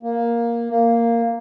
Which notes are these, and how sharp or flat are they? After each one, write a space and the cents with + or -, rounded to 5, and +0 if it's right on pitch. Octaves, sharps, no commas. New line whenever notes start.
A#3 +5
A#3 -5